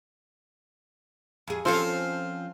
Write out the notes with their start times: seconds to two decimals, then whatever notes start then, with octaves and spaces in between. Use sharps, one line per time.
1.48 F2 G#4
1.65 F3 C4 C#4 F4 A4